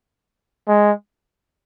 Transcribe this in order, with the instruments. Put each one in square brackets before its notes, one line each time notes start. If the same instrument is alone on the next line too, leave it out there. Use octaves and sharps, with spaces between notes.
[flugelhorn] G#3